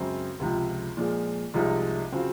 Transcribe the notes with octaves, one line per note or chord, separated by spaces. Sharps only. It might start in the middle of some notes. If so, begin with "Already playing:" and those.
Already playing: F#2 C#3 G#3 C4
C#2 C3 F3
A#2 F3 G#3
C2 C3 F3 G#3 D#4
C#3 F#3 C4 F4